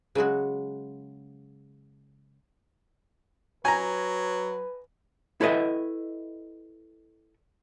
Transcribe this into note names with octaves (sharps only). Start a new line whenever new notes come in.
C#3 F#3 G#3 F#4
F#3 B4 G#5 A#5
E4 A4 B4 D#5 E5